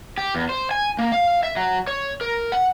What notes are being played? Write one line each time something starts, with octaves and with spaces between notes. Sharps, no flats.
G4
E2
C5
G#5
A#3
F5
E5
F#3
C#5
A#4
F#5